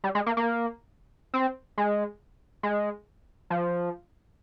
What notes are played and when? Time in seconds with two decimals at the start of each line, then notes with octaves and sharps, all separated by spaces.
0.04 G3
0.15 G#3
0.26 A#3
0.37 A#3
1.34 C4
1.78 G#3
2.63 G#3
3.50 F3